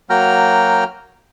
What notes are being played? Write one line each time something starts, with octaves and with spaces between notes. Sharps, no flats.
F#3 A#3 F#4 G5 A#5 F6